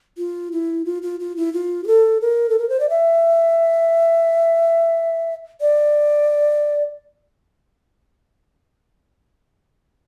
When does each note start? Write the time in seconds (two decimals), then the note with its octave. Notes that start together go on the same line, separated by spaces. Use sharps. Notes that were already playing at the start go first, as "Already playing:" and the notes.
0.18 F4
0.52 E4
0.85 F4
1.02 F4
1.20 F4
1.37 E4
1.53 F4
1.84 G4
1.87 A4
2.21 A#4
2.49 A4
2.59 A#4
2.69 C5
2.80 D5
2.89 E5
5.61 D5